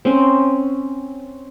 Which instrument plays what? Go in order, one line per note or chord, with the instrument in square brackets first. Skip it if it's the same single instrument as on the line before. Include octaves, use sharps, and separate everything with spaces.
[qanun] C4 C#4 C5